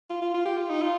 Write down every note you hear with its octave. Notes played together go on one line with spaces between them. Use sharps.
F4
F4
F4
G4
F4
D#4
F4